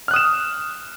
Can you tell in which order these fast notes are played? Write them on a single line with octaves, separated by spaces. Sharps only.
F6 F#6 D#6 E7